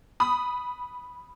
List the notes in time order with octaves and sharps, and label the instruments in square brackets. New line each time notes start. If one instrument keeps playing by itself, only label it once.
[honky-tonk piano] B5 D#6